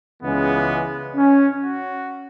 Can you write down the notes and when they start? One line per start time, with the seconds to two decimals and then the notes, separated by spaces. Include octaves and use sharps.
0.21 C#2 C#3 E3 G#3 B3
1.15 C#4
1.62 F#4